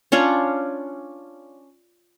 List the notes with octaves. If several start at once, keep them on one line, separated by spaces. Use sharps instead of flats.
C#4 D4 F4 C#5